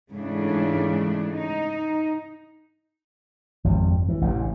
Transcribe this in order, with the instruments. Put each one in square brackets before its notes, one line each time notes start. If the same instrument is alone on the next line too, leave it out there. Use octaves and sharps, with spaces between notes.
[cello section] G#2 C#3 E3 A3 D4
D#4
[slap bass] G#1 F2 G3
E3
A1 A2 C#3